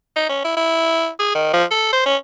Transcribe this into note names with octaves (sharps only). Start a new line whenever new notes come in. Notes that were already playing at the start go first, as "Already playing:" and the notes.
D#4
C#4
E4
E4
G#4
D#3
F3
A4
C5
C#4